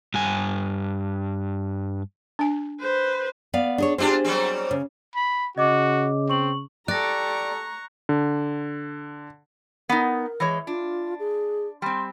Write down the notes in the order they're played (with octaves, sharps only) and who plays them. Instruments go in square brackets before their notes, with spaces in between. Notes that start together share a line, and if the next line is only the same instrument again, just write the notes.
[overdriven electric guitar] G2 G#5
[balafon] D4 G#5
[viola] B4 C5
[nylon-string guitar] B3 D5 F5
D4 G#4 C#5
[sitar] C4 D4 F4 [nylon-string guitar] G4 G#4 C5
[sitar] F#3 G3 C4
[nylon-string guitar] C#3
[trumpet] B5
[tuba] C#3 [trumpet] F#4 [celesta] D#5 D6
[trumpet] C4 [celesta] C#6 F#7
[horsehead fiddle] G4 A4 [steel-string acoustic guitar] D5 [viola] A#5 C#6 [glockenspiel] F#6 A#6
[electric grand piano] D3
[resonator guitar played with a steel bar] B3 D#4 [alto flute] A#4
[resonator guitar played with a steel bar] E3 G#3 C#5
[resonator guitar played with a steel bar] D4 [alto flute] F4
[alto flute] G#4
[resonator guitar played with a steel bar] G3 C4 [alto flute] C6